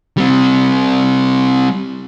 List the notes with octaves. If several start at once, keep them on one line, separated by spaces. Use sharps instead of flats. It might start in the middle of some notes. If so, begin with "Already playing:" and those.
G3 C4